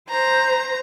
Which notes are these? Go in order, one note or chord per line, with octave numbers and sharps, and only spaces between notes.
C5 A#5